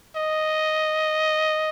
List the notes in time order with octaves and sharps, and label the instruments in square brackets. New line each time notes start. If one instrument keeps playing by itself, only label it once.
[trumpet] D#5